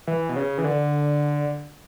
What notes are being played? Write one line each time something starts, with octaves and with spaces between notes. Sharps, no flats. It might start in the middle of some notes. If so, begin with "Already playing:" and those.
E3
B2
C#3
E3
D3